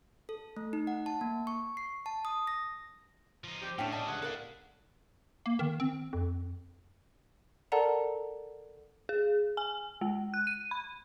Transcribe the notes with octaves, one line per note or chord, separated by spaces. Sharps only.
A4
A3
D#4
F#5
A5
A#3
C#6
C7
A5
D#6
A#6
F3 D#4
C4 G4
A2 C#4 D4 E4 E5 G5
D4 G#4 D5 D#5 A5
C#2 G2 A3 G#4 F#5
E4 A4 A#4 D5 F5
A#3
D#3
C4
F2
A4 A#4 D5 F#5 A5 A#5
G#4
G#5
G#3
F#6
D#7
B5